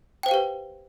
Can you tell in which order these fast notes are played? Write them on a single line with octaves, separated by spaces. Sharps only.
G5 C5 F5 G4 B4